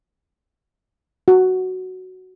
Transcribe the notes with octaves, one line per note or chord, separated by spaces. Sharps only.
F#4